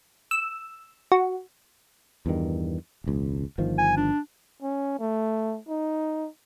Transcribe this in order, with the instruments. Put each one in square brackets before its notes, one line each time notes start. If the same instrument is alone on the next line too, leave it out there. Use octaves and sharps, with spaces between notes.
[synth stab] E6
F#4
[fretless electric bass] E2 G2 D#3
E1 C#2
G1 D#3 F3
[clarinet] G#5
D4
[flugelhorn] C#4
A3
D#4